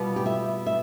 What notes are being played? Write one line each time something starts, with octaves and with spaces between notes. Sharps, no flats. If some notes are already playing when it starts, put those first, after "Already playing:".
Already playing: B2 G3 B3 F4
G4
E5
E5